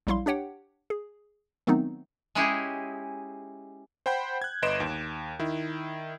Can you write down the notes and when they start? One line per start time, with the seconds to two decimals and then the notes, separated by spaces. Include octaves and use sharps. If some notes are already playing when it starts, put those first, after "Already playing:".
0.07 A#1 F#3 G3 E4 F5 C6
0.26 D4 G4 C#5 F#5 G5
0.90 G#4
1.67 D#3 F#3 A3 B3 C4 D#4
2.35 G#3 C#4 D#4 E4 G4 G#4
4.06 C5 F#5 G5 B5 G6
4.42 F#6 G#6
4.62 G1 B4 D#5 C6 D7 E7
4.80 D#2
5.39 D#3 E4